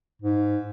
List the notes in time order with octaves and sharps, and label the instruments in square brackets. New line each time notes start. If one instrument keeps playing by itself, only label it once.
[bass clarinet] G#2